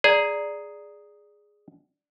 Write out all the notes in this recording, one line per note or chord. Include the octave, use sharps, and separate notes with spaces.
G#4 D5 A#5